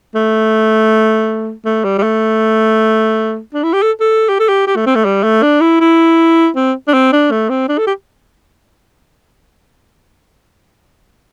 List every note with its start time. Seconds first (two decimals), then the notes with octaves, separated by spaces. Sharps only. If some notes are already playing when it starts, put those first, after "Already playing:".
0.15 A3
1.65 A3
1.84 G3
1.98 G3
2.03 A3
3.53 D4
3.63 E4
3.73 G4
3.82 A4
4.00 A4
4.29 G4
4.39 A4
4.49 G4
4.67 G4
4.76 A3
4.86 C4
4.95 A3
5.05 G3
5.23 A3
5.42 D4
5.60 E4
5.80 E4
6.55 C4
6.88 D4
6.94 C4
7.12 D4
7.31 A3
7.49 C4
7.69 D4
7.78 A4
7.87 G4